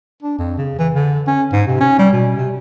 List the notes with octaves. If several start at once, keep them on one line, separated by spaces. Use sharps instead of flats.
D4
F2
C#3
E3
D3
C#4
G#2
C3
C#4
G3
B2
C3